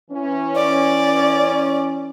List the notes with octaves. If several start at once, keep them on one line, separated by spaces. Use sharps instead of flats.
E3 C#4
D5